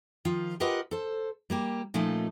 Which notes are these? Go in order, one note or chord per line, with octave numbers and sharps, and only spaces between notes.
D#3 F3 F4
F4 G4 A#4 B4 D#5 F#5
A4 C5
G3 A#3 G4
A#2 F3 A3 C#4 D#4